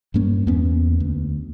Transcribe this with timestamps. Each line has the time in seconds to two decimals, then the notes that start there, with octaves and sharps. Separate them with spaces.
0.14 G2 G3 A#3 C#4
0.47 E2 A#3 B3 C#4
1.00 D2